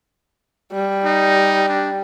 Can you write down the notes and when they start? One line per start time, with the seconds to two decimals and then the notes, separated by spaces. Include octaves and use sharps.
0.73 G3
1.04 D#4
1.68 D4